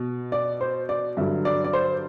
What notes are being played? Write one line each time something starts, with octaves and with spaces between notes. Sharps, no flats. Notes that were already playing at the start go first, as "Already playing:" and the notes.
Already playing: B2
D5
C5
D5
G2 D3 F#3 E5
D5
D5
C5